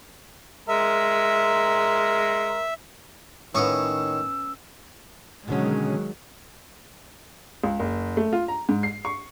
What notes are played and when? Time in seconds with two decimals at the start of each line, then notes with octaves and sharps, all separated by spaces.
0.68 G#3 A#4 E5 C6
3.55 A2 D#3 B3 C#4 C#6 D#6 E6
5.48 B2 D3 D#3 F#3 G#3 C#4
7.64 C#2
7.79 F#1
8.17 A3
8.33 F4
8.48 A#5
8.69 G#2
8.83 C7
9.05 C#6